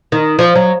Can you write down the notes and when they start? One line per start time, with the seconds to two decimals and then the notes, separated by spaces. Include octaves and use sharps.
0.12 D#3
0.39 F3
0.55 F#3